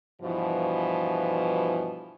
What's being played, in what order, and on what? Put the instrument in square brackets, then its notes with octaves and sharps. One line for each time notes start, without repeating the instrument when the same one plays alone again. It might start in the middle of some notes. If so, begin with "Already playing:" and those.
[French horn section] G2 B2 E3 F3